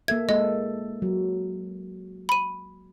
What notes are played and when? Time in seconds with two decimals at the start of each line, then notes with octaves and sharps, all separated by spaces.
0.08 A#3 A4 E5 G#6
0.29 G#3 A#3 A4 D#5
1.02 F#3
2.29 B5 D#7